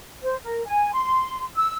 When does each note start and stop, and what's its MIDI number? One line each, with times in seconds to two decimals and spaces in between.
0.23 0.35 72
0.43 0.65 70
0.66 0.93 80
0.94 1.44 84
1.57 1.77 88